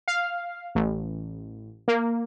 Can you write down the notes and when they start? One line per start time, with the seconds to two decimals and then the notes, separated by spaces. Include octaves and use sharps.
0.08 F5
0.75 A1
1.88 A#3